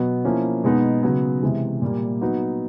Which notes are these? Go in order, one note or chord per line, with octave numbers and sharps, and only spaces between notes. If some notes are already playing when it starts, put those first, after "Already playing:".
Already playing: B2 F#3 B3
F3 A#3 C#4 E4
B2 G#3 B3 D#4
C#3 F#3 B3
C3 E3 G#3
A#2 G3 A#3
F#3 B3 D#4 F#4